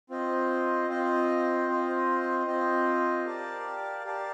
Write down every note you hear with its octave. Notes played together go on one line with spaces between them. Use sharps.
C4 F4 C5 D#5
C4 F4 C5 D#5
C4 F4 C5 D#5
C4 F4 C5 D#5
G4 A#4 D5 F5 A5
G4 A#4 D5 F5 A5